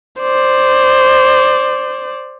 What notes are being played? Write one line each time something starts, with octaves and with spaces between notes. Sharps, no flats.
C5 D5